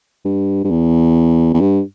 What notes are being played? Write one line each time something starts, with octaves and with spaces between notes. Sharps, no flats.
G2
G2
E2
E2
G2